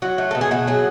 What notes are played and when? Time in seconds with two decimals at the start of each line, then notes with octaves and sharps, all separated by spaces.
0.02 F#3 F#4
0.18 A3
0.31 B2 A4
0.41 G#4
0.51 B2 F#4
0.67 F#3 G#4